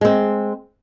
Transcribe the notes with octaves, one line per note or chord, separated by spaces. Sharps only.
G#3 C4